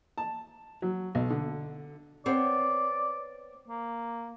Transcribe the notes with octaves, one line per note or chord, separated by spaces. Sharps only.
A5
F#3
B1
D3
B3 C4 C#5 D5
A#3